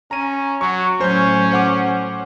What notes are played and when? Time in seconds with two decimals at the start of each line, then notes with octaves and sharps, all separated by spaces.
0.11 C#4 A#5 D#7
0.61 F#3 C#6
1.01 A2 F#3 C#4 C5 G6
1.52 C5 F#5 D6